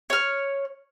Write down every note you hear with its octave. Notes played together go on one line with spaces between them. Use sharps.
C#5 F6